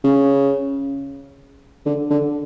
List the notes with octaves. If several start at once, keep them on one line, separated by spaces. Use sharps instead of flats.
C#3
D3
D3